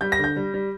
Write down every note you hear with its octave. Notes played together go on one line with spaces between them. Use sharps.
G3 G6
A#6
D3
G6
G3
G3